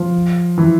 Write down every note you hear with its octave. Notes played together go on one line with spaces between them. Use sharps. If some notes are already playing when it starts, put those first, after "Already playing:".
Already playing: F3
E3